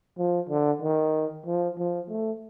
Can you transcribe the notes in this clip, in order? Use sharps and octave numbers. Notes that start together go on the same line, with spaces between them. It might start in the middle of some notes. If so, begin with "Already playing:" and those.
F3
D3
D#3
F3
F3
A3